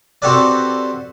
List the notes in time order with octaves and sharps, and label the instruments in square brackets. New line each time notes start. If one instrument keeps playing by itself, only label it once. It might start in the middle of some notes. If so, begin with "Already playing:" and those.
[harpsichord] C4 F#4 G4 A4 B4 D5